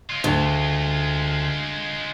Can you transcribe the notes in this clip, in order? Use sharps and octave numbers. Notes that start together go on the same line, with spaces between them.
G#3 F4
D2